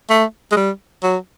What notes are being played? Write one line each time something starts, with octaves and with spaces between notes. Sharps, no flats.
A3
G#3
G3
F#3